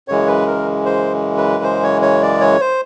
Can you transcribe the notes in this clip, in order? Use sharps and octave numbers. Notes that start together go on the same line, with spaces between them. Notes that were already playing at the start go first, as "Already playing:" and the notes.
F#2 C#3 E3 G#3 C#5
B4
A#4
C5
B4
C5
C#5
C#5
D5
C#5
C5